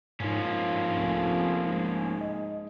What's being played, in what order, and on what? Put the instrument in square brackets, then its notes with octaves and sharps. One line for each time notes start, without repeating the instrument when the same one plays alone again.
[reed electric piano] G#2 D#4 [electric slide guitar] F3 A#3 C#4
[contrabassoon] F1 [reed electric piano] C2 C6
[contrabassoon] G#2
[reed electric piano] D#5